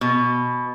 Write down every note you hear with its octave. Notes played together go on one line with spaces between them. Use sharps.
B2